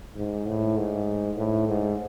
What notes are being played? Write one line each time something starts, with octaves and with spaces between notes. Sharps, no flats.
G#2
A2
G#2
A2
G#2